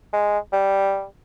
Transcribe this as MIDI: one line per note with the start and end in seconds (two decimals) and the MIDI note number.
0.13 0.38 56
0.52 1.05 55